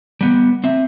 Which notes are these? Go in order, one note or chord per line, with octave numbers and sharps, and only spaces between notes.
G3 B3
C4 E5